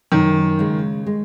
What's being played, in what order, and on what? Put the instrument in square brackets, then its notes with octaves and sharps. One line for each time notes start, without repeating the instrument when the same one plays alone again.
[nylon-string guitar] F#2 [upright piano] D#3
[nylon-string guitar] C#3 G#3
G#3